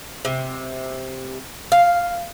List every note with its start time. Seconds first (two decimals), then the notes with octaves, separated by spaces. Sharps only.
0.25 C3
1.72 F5